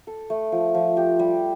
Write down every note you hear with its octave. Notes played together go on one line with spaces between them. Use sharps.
A4
A3
F3
F3
G4
G3